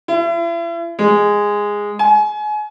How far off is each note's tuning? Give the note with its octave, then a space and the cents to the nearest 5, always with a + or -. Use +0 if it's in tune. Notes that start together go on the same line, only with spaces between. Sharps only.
E4 +40
G#3 -10
G#5 +30